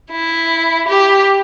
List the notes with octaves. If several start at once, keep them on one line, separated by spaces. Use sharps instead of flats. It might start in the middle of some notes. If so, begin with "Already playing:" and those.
E4
G4